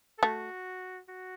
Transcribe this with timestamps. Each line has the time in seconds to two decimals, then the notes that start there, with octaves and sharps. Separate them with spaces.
0.19 A4
0.23 A3 F#4
1.09 F#4